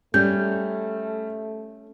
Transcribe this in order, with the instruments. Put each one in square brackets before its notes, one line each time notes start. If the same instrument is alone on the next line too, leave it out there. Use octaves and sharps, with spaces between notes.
[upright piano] G3 [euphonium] A3 [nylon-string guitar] C#4 [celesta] G6